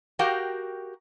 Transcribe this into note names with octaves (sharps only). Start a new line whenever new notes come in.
F#4 G4 A#4 F5 G5